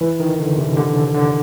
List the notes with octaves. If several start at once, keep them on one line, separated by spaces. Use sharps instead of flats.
E3
D#3
D3
C3
D3
D3